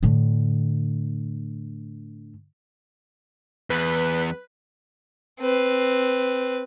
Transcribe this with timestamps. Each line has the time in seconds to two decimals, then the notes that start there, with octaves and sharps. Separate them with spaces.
0.03 A2 D3
3.70 E2 B4
5.40 C4 B4